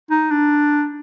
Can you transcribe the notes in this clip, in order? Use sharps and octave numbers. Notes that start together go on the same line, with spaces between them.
D#4
D4